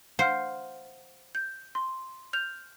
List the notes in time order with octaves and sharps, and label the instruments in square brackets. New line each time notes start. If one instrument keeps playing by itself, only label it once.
[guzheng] C5 [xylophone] F5 F#5 F6
[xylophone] G6
C6
F6 G6 F7